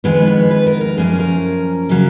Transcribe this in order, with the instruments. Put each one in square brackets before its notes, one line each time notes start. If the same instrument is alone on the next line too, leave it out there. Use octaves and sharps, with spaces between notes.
[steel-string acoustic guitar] F2 D#3 G#3 B3 B4
C#5
B4
A#4
A#4
F#2 F3 A#3 C#4 G#4
A#4
C#3 F#3 A#3